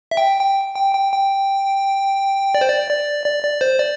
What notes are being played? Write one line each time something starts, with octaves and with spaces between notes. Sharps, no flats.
E5
G5
G5
G5
G5
G5
D5
C5
D5
D5
D5
D5
C5
D5